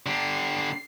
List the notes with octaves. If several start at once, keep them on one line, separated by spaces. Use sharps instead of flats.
D3 G4 C7